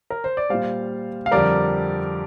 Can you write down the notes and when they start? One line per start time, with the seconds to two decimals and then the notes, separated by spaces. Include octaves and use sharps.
0.10 A#4
0.24 C5
0.37 D5
0.49 A#2 G3 C5 F5
1.26 F5
1.31 F2 D3 G3 A#4 D5